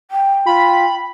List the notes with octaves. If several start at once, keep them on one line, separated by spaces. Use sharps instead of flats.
G5
F4 B5